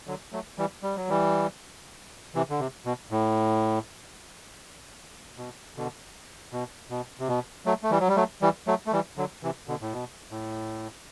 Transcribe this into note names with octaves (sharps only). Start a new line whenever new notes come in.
D3 F#3
F#3 A3
E3 G3
G3
F#3
E3 G3
C3 E3
D3
C3
B2
A2
B2
B2 D3
B2
B2
C3
B2
F#3 A3
A3
E3 G3
F#3
G3
F#3 A3
E3 G3
F#3 A3
A3
E3 G3
D3 F#3
C3 E3
B2 D3
A2
B2
A2